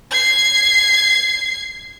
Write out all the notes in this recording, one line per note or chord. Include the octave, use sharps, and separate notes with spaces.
G#6 C7